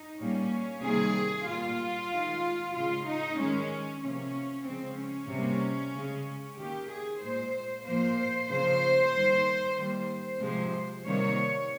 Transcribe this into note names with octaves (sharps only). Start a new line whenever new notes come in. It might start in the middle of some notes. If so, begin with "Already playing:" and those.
Already playing: D#4
A#2 G3 A#3 C#4
C3 D#3 G3 A#3 G#4
A#2 G3 A#3 F4
D#3 G#3
C#3 G#3 F4
D#4
D#3 G#3 C#4
C3 F3 A#3 C#4
C#3 F3 G#3 C4
C#4
C3 G3 A#3
C#3 G#3
D#3 A#3 G4
G#4
A#2 G#3 C5
A#2 F3 A#3 C5
C#3 F3 A#3 C5
D#3 G3 A#3
D#3 G3 A#3 C5
C3 F3 G#3
C3 D#3 G3 A#3 C#5